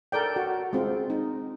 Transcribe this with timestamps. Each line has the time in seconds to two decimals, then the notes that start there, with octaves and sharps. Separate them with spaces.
0.12 A4 A#4 D5 G5
0.36 F#4 F#5
0.73 G#3 C4 F4
1.10 D#4